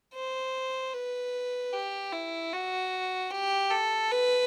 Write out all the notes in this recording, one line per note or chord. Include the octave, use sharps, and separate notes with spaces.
C5
B4
G4
E4
F#4
G4
A4
B4